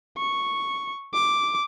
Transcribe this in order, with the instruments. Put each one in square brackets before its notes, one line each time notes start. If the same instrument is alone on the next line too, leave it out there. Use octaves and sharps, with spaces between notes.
[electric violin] C#6
D6